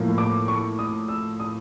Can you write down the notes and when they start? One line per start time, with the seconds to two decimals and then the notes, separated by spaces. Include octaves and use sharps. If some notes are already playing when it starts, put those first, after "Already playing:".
Already playing: A2 F3 A#3
0.18 D6
0.48 C#6
0.79 D#6
1.08 E6
1.40 D#6